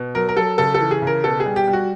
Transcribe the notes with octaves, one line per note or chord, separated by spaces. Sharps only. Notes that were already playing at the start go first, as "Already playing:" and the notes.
Already playing: B2
F#3 A#4
A#4
F#3 A4
C#3 A4
A4
E3
G#4
C#3 A#4
B2 A4
G#4
G3
G4
G3
F#4